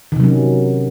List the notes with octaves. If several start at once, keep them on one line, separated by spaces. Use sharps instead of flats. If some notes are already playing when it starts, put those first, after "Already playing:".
C3 D#3 F#3 C#4